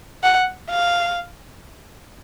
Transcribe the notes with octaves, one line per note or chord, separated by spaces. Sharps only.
F#5
F5